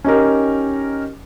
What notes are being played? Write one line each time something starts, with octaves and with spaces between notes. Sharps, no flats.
C#4 D#4 G4 A#4